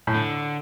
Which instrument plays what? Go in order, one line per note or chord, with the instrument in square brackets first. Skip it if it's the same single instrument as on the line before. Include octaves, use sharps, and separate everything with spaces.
[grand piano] A2
[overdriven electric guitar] D3